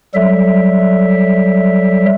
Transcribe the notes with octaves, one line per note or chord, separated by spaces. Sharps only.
F#3 G3 A4 E5